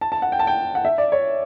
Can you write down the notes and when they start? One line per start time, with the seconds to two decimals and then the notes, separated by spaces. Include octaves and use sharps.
0.01 A5
0.12 A5
0.22 F#5
0.32 G5
0.39 A5
0.47 G5
0.75 F#5
0.85 E5
0.98 D5
1.12 C#5